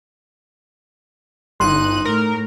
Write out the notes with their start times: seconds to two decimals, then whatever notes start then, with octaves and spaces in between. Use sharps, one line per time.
1.60 G1 D#4 C6 F#6 D#7
2.05 A2 A#4